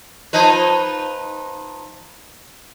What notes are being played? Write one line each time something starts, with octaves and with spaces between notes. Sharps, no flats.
F3 D#4 B4